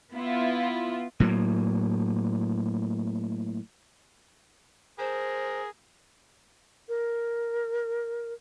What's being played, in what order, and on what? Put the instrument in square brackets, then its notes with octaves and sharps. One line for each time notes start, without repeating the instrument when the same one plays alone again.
[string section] B3 E4 F4
[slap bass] A2 F#3 A#3
[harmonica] G#4 A#4 [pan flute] C5
[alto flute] A#4